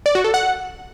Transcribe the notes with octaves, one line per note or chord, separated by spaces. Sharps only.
D5
F#4
A4
F#5